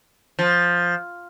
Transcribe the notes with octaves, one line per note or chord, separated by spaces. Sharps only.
F3